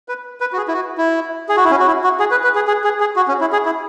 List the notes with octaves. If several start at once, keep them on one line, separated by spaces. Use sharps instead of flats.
B4
B4
F#4
G#4
E4
F#4
E4
G#4
F#4
E4
C#4
F#4
E4
F#4
G#4
B4
B4
G#4
G#4
G#4
G#4
F#4
C#4
E4
G#4
E4